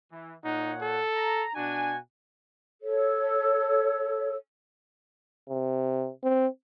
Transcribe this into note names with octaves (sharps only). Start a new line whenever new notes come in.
E3
A#2 D#4 C#5 F#5
A4
A#5
B2 D4 F#4 G#5
A4 C#5
C3
C4